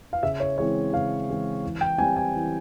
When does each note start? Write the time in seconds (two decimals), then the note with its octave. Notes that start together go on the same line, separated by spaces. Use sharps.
0.13 F5
0.23 C#3 E5
0.40 C#5
0.58 E3 G#3 C4 C#5
0.93 C#3 F5
1.28 E3 G#3 C4
1.63 E3
1.81 G5
1.98 C4 G#5
2.01 G3
2.16 G#5
2.34 E3